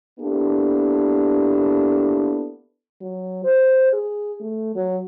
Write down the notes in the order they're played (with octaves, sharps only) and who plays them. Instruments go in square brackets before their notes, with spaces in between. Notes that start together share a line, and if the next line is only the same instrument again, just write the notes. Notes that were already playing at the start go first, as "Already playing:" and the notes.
[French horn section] A#3 B3 D4 E4 G4 A4
[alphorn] F#3
C5
G#4
A3
F#3